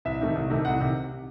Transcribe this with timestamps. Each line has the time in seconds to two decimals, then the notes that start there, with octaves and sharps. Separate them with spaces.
0.05 C2 E5
0.20 C3 D#3 A3
0.35 C2
0.50 C3 D#3 A3
0.65 C2 F#5
0.80 C3 D#3